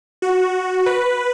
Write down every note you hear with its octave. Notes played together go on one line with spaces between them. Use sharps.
F#4
B4